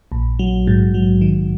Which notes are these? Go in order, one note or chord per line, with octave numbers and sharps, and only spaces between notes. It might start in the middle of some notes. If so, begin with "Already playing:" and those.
A#1
F#3
G#2
F#3
D#3